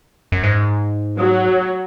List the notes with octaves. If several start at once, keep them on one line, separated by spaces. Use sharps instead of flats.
F#2
G#2
F#3